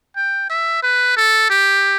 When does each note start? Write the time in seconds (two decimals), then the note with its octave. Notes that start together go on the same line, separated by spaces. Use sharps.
0.16 G5
0.50 E5
0.83 B4
1.16 A4
1.50 G4